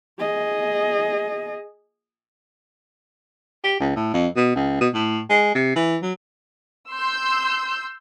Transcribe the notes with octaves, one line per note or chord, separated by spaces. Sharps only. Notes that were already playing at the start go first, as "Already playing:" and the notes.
G#4 D#5
G4
C#2
A2
F2
B2
C#2
B2
A2
G#3
C3
E3
F#3
C6 E6 G6